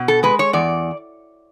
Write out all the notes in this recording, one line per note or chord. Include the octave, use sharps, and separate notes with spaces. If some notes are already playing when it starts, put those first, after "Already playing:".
Already playing: B2
A4
G#3 B4
C#5
E2 D5